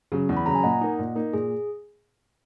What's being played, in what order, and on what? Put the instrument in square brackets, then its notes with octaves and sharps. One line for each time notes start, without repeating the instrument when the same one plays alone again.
[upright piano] C#3 F#3
E2
[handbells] B5
[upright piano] C#3 [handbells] A#5
[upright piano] F#3
[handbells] G#5
[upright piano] A#2 [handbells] D#5 F#5
[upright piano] A#3 D#4
A#2
A#3 D#4
[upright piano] A#2 [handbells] G#4